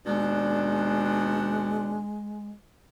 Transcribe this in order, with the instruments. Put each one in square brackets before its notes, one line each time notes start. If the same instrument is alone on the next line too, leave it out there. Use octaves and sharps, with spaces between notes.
[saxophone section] D#2 B2 D4 [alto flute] G#3